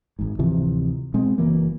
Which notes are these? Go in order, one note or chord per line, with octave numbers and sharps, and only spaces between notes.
G#1 G#2
D1 C3 E3 F3
B2 G#3 C4
F#1 E3 F#3 A#3